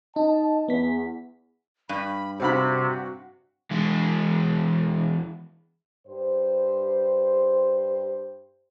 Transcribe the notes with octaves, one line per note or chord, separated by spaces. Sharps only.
D#4 D#5 A5
E2 B3 B6
G2 B5
C3 C4 F#4 F5 B5
E2 G#3
G2 G4 C5